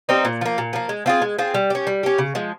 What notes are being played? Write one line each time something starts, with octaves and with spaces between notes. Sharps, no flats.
G3 C4 D#4
A#2
F3 A#3
A#2
F3 A#3
G#3
C4 F4 G#4
G#3
C4 F4 G#4
G3
C#4 G4
G3
C#4 G4
C#3
F3 G#3